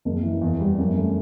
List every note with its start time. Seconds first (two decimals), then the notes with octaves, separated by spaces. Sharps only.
0.05 F#1
0.23 E3
0.41 E2
0.60 G3
0.78 F#2
0.97 A3